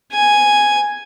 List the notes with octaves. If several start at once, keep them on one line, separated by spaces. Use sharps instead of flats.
G#5